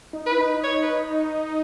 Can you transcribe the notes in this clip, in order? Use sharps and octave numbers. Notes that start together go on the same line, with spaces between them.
D#4
B4
E4
D#4
C#5
B4